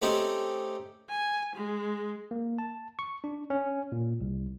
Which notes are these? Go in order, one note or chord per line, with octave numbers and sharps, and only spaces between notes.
A3 C4 C#4 D#4 G4 C5
G#5
G#3
A#3
A5
C#6
D4
C#4
A#2
C2